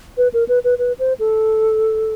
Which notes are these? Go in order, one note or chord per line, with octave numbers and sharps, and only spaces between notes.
B4
A#4
B4
B4
B4
C5
A4